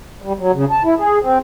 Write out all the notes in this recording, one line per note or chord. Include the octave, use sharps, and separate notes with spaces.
G3
F#3
C#3
A5
E4
G#4
C4